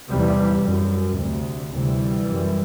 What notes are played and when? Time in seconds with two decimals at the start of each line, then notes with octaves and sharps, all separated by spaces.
0.10 E2 C3 E3 G3
0.65 F#2
1.18 D2 C3
1.72 D2 C3 E3 G3
2.27 F#2